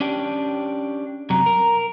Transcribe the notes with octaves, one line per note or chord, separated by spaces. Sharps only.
C#4 D4 G4
F#2 C3 F#3 A#5
A#4